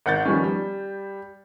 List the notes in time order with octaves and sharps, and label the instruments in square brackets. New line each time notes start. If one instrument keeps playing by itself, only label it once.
[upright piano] G#1 F#5 G6 A6
D#3 F3 G3 B3 C#4
G3